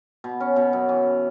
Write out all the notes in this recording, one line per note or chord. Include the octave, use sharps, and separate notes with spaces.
B2
C#4
B2
F#2
E3